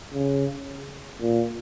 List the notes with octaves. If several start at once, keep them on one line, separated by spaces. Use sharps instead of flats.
C#3
A#2